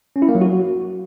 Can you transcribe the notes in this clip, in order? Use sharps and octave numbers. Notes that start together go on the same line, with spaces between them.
C#4
E4
A#3
F#3
F#4